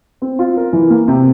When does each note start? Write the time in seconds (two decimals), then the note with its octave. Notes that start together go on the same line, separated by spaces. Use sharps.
0.22 C4
0.39 F4
0.57 A#4
0.73 E3
0.90 A#3
1.08 C3